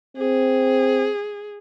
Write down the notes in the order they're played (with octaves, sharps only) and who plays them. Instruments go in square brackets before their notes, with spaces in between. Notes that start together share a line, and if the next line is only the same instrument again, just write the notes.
[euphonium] C4 [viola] G#4